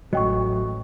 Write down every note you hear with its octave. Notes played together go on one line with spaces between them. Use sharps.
A1 F#3 D#5 G5 C#6